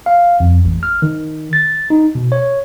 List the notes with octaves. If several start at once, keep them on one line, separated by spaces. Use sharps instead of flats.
F5
F2
A1
F6
D#3
A6
D#4
B2
C#5